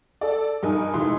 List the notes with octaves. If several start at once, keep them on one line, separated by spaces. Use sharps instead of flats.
A4 D5
G2 D#4 A#4 G#5
F1 E3 G#3 D#4 C6